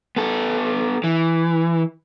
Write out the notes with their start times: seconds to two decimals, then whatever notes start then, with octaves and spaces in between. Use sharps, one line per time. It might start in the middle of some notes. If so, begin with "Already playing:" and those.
0.17 B3 A4
1.04 E3